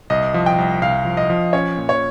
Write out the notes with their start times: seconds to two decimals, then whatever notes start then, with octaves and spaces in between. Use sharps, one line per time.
0.10 C2 D#5
0.34 F3
0.46 G5
0.58 C2
0.81 C2 F5
1.05 F3
1.17 D#5
1.30 F3
1.53 C#4 C#5
1.78 A#2
1.89 C#5